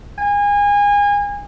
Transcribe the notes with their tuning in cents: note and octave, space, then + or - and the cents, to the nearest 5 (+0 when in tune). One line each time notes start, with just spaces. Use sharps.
G#5 -30